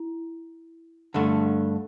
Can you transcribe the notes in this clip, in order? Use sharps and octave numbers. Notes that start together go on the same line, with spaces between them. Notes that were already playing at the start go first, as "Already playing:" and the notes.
Already playing: E4
G2 D3 A3